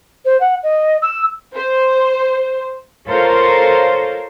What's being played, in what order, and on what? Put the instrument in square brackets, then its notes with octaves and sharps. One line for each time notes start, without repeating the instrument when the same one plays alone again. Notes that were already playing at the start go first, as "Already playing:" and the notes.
[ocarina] C5
F#5
D#5
E6
[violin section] C5
[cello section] F4 A4 A#4 C5 C#5 F5